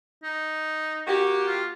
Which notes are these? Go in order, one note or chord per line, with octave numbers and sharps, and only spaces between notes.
D#4
A#3 F#4 G4
F4